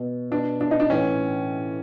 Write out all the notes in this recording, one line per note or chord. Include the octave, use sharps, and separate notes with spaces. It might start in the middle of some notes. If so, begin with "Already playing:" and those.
Already playing: B2
B2 D4
D4
D#4
D4
A2 E3 C#4